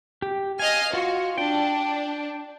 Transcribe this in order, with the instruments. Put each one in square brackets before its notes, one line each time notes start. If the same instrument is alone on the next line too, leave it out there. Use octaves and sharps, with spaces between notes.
[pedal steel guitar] G4
[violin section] D#5 F5 F6 [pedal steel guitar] G#5
[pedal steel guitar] F4 [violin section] F#4
[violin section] D4 [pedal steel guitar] G5